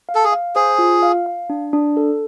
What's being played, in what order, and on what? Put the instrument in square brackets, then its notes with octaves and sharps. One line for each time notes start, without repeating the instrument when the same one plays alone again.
[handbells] F5
[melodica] A4
G#4
[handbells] F5
[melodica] G#4 [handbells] C5
[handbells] F4
F5
F5
D4
D4
A4